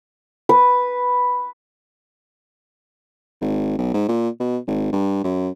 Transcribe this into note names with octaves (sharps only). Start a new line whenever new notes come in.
B4
G#1
B1
G#2
A#2
B2
G#1
G2
F#2